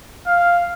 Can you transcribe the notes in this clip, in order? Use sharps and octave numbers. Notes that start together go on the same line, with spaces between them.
F5